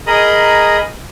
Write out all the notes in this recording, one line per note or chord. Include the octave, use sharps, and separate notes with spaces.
G#4 A#4 D#5 A#5 B5 D#6